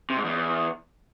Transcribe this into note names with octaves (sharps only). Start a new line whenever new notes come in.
C3
G#2
E2